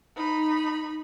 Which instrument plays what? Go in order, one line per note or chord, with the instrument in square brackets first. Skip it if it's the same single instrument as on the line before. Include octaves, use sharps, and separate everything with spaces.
[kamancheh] D#4 B5